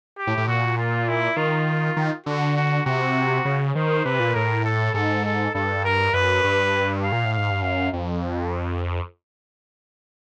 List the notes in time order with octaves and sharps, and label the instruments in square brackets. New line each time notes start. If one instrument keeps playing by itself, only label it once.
[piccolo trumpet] G4
[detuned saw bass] A2
A2
[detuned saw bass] A#2 [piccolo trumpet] F#4
[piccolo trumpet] F4
E4
[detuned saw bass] D#3 [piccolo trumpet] F4
[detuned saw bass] D#3
[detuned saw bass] D3 [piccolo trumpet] F#4
[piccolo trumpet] F#4
[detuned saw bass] C3 [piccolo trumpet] F#4
[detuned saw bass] C#3
[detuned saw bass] D#3 [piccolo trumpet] C5
[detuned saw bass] C3 [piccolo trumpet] B4
[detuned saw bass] A#2
[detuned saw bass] A2 [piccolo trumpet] A#4
[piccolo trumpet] A4
[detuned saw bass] G#2 [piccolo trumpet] A4
[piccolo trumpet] A4
[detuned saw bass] G2 [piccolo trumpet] A4
[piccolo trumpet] A#4
[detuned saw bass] F#2 [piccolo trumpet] B4
[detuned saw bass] G2
[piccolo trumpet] F5
[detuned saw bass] A#2
A2
[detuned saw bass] G#2 [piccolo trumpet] F5
[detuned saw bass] G2
[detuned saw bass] F#2 [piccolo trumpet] F5
[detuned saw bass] F2